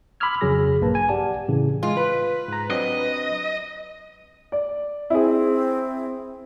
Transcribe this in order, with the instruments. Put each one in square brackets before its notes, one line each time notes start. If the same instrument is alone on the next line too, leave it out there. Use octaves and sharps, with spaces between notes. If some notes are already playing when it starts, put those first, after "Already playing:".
[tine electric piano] B5 C6 D6 E6 F6 G#6
F2 C#3 F#3 G#4 A#6
A#1 G2 A#3 B4 A5
G#5
G4 D5 F#5 A5
A2 C#3 E3
[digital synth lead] G#3 [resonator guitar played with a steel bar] F4
[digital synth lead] B4
[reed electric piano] G#2 A#5
[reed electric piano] F#3 C4 D4 [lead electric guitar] D#5
[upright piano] D5
[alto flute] C4 [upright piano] E4 G#4